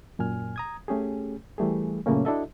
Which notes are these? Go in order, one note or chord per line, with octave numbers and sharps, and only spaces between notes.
F#2 A#2 G#5 F6
A#5 D#6 G#6
A3 C#4 G4 G#4
E3 G3 A3 G4 G#4
F#2 A#2 C#3 A3 A#3 C#4
D4 E4 F#4 A4 D#5 E5